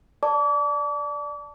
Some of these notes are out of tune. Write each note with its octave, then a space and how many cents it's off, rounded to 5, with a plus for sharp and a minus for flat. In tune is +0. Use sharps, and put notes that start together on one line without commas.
D5 +0 A5 +0 D6 -40